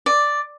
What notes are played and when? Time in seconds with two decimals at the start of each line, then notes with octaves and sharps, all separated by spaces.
0.06 D5